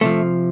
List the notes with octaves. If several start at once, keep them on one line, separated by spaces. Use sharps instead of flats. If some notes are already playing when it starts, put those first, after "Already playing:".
C3 F3 A3